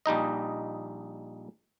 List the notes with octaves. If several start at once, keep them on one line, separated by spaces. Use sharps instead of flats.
A#1 G3 D#4 D#5